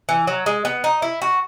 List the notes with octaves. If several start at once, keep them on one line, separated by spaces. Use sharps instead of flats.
E3
F#3
G#3
B3
D#4
E4
F#4